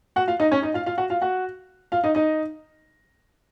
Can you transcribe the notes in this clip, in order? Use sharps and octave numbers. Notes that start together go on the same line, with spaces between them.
F#4 F#5
F4 F5
D#4 D#5
C#4 C#5
D#4 D#5
F4 F5
F4 F5
F#4 F#5
F4 F5
F#4 F#5
F4 F5
D#4 D#5
D#4 D#5